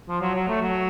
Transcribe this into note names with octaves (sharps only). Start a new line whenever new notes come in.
F3
F#3
F#3
A3
F#3